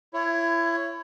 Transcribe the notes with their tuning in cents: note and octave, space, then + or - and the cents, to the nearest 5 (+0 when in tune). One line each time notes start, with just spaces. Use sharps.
E4 +30 C#5 +0